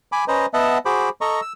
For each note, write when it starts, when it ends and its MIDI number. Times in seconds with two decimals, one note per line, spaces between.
0.12 0.24 80
0.12 0.24 83
0.12 0.24 86
0.28 0.46 61
0.28 0.46 71
0.28 0.46 72
0.28 0.46 75
0.28 0.46 82
0.54 0.78 59
0.54 0.78 75
0.54 0.78 76
0.54 0.78 78
0.54 0.78 81
0.85 1.09 66
0.85 1.09 68
0.85 1.09 72
0.85 1.09 83
0.85 1.09 86
1.21 1.40 69
1.21 1.40 75
1.21 1.40 82
1.21 1.40 85
1.42 1.53 88